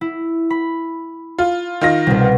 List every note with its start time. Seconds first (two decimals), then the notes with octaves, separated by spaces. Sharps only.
0.01 E4
0.50 B5
1.39 F4
1.81 D#3 F4 A#6
2.07 C2 B2